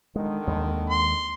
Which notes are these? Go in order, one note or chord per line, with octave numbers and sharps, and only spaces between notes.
D3 D#3 G#3
D#2 G#3
C6